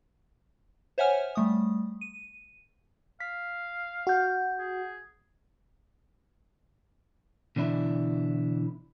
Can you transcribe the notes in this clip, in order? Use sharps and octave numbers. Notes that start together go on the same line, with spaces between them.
C5 C#5 E5 F#5 G#5 F6
G3 A3 D#6
D#7
F5 B6
F#4 F#5 G6
G#4
B2 D3 E3 D4 E4